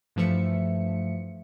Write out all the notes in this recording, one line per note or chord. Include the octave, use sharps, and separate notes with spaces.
G2 E3 F3 A3 E5 C#7